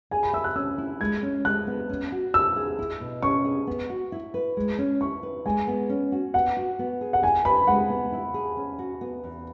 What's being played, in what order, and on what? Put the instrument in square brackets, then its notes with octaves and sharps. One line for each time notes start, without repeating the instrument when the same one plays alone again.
[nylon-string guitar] G#4 [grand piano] G#5
[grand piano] B5
[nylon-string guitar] E5 [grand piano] E6
[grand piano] F#6
[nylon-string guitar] C#4 [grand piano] E6
[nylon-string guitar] E4
[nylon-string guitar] G#3 [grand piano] G#6
[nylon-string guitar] C#4
[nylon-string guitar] G#3 [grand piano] F#6
[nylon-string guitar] B3
C#4
F#4
[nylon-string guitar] E4 [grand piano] E6
[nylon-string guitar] G#4
E4
B2
[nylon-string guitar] C#4 [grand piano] C#6
[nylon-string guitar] G#4
B3
F#4
E4
B4
G#3
C#4
[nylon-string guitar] E4 [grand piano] C#6
[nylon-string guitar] B4
[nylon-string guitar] G#3 [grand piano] G#5
[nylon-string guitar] B3
C#4
F#4
[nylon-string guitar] B3 [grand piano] F#5
[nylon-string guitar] F#4
B3
G#4
[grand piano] F#5
[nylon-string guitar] E4 [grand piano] G#5
[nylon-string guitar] B4 [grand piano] B5
[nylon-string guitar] G#3 [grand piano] F#5
[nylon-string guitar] B3
E4
G#4
C#4
F#4
B3
E2